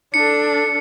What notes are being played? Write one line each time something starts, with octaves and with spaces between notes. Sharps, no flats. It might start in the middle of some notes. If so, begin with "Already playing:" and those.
D4 A4 C#7